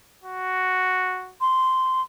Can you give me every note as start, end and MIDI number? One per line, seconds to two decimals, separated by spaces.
0.24 1.33 66
1.41 2.02 84